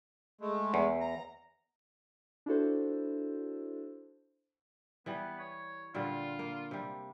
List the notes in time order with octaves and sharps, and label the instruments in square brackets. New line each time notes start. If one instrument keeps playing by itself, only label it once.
[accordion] G#3 A3
[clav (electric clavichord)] E2
[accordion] A#5
[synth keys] D4 E4 F#4 A4 C5
[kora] E3 G3 [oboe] B3
[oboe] C#5
[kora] A#2 D3 G3 [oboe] F4
[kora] A#3
C3 G3